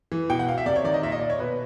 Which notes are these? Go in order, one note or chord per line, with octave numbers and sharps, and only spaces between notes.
E3
B2 G5
F#5
F5
E5
C3 D5
C#5
D#3 D5
D#5
A#2 E5
D#5
D5
C#5
B2 B4